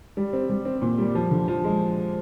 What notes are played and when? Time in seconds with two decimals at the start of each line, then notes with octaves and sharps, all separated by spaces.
0.17 G3
0.33 C4
0.49 G3
0.65 C4
0.82 A#2
0.98 G3
1.15 F3
1.31 D3
1.48 F3
1.64 G#3